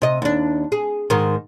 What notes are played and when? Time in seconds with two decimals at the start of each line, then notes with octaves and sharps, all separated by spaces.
0.02 C3 D#5
0.22 D#2 D4
0.72 G#4
1.10 G#2 D#3